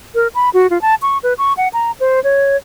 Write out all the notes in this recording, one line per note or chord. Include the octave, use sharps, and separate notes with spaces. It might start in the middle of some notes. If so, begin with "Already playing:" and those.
A#4
B5
F#4
F4
A5
C#6
B4
C#6
F#5
A#5
C5
C#5